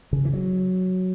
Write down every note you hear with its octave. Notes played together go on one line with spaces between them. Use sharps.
C#3
E3
F#3